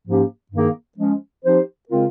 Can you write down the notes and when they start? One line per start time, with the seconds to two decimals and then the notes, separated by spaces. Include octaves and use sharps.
0.07 G#2 F3 A#3 C#4 G4
0.52 G2 D#3 A#3 D#4 G#4
0.97 F3 G#3 C#4
1.44 F3 C4 D#4 G4 C5
1.89 C#3 G#3 C4 F4 A#4